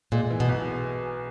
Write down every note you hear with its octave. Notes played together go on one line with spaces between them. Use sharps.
A#2 G#3
E3
B2
B1